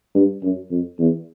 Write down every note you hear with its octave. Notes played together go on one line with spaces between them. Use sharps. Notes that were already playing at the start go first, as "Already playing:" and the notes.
G2
F#2
F2
E2